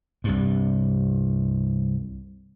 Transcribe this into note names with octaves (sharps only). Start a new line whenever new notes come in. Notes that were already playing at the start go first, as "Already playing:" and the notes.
C2 G2